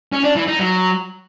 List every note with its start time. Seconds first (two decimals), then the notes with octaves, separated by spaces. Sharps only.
0.13 C#4
0.24 D4
0.36 E3
0.48 D#4
0.59 F#3